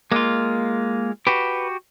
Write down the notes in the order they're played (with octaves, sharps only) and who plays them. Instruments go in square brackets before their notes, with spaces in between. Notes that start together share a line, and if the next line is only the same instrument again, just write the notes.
[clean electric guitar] G#3 F4 [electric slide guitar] A#3
[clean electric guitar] F#4 G4 [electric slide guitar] B4